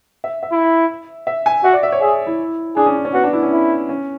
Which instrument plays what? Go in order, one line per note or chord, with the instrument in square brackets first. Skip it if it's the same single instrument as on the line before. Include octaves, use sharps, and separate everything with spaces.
[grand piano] E5
E5
[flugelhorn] E4
[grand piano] E5
G#5
[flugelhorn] F#4 [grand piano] E5
[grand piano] D5
E5
C#5
[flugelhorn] G#4 [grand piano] E5
[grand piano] E4
[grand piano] D4 [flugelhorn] G#4
[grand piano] C#4
D4
C#4
[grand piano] B3 [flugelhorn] F#4
[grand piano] D4
E4
C#4
[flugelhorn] E4
[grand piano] C#4